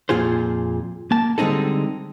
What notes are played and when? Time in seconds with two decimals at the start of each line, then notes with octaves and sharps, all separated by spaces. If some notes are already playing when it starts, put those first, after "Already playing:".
0.09 F2 A#2 F4 G#4 C5
1.11 A#3 A5
1.38 D3 G3 G#3 C4 D#4 A4